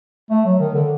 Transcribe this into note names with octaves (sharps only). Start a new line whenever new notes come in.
A3
F#3
D#3
D3